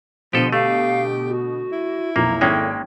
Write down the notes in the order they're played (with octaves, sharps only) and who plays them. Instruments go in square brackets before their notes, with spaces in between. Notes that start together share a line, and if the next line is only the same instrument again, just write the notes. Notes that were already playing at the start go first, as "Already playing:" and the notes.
[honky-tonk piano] B2 D3 D#7 [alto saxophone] F3 [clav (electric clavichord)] G4 A4 [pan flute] C6
[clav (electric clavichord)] A3 [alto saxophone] G4 [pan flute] F5
[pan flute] F#4
[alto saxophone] E4
[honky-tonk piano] B1 F2 F3 [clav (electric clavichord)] A#3 [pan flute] A#5
[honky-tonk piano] G#1 C#5 G5 [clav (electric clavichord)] G#3 A#3 C#4 [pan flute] A4